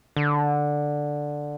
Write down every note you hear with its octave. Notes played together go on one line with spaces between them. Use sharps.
D3